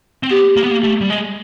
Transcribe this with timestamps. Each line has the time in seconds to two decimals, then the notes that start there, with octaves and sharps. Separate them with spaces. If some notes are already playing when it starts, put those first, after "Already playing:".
0.23 C4
0.30 B3 G4
0.56 A#3
0.64 B3
0.71 A#3
0.83 A3
1.01 G3
1.10 G#3